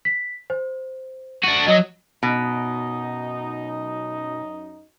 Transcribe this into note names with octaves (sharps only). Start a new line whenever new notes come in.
B6
C5
D4 F#4 D#7
F#3 D#5
F#2 B2 D#4